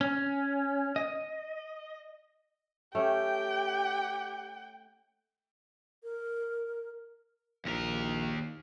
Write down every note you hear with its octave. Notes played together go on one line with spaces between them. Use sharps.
C#4
D#5
A3 C#4 G4 G5
A#4
A#1 D#2 A#4